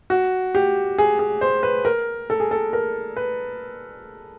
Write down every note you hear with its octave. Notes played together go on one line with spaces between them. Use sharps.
F#4
G4
G#4
G#4
C5
B4
A#4
A4
G#4
A4
A#4
B4